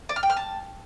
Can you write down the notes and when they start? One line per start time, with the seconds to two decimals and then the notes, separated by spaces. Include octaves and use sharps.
0.09 D5
0.16 F6
0.23 G5
0.30 F6
0.36 A5